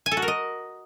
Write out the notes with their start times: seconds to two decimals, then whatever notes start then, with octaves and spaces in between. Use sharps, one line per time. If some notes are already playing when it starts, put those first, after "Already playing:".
0.06 G#5
0.11 A4
0.17 F#4
0.22 A#4
0.28 D#5